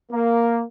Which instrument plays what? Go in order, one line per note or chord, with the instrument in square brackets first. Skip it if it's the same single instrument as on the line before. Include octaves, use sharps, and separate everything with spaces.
[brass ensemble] A#3